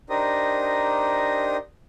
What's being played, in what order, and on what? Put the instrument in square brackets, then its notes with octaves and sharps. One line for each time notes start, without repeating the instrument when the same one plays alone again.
[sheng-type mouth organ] D4 D#4 G4 A#4 C5 D#6